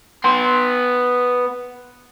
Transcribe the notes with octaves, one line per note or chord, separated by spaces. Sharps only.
B3 C6